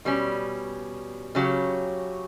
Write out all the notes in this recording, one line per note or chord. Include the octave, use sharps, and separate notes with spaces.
B2 G3 C#4
C#3 F#3 C#4 G4 C#5